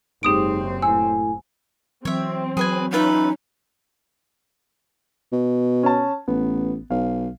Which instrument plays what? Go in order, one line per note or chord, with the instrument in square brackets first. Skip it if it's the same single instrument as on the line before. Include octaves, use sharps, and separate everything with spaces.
[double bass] F#1 C4 [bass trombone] G#2 [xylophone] G4 D#6 D7
[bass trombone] A2 [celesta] G#5 [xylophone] E6
[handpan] E3 F#3 [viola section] C4 [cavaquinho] C#5 E5
[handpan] F#3 [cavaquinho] G#4 B4 G#5
[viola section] C#4 [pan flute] D#4 [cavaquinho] F4 B4 E5
[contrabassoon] B2
[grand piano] C#4 A5
[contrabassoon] A1 [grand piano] B3
[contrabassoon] B1 [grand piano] F5